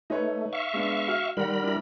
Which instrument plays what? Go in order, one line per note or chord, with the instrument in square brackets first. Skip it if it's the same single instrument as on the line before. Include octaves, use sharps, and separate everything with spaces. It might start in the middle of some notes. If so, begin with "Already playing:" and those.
[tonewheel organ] A3 [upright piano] D#4 B4 C#5
[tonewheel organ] E5 F5 C#6
[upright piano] G#3 B3 D4
F#4 F6
[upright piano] D#3 F#5 [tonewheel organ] G3 A#4 B5
[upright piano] D4 E4